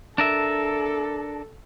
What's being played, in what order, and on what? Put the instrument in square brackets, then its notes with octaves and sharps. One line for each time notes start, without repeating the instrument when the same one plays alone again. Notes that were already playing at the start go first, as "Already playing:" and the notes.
[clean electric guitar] D4 A#4 E5 [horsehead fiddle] A4